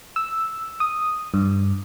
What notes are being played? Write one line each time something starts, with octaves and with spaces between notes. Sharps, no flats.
E6
D#6
G2